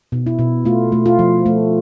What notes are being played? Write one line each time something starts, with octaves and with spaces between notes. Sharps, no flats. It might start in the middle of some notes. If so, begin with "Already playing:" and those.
B2
E4
B2
A3 F4
A3
F4
F3
A3